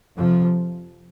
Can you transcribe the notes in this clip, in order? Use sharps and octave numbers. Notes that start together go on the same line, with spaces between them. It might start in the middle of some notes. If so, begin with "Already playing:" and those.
F2 C3 F3